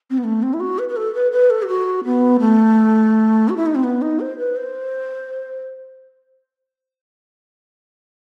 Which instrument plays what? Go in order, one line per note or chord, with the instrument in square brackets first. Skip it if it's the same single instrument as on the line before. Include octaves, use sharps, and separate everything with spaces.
[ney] C4
B3
A3
C4
E4
F#4
B4
B4
A4
B4
B4
A4
G4
F#4
B3
A3
F#4
E4
D#4
C4
B3
D#4
C5
B4
C5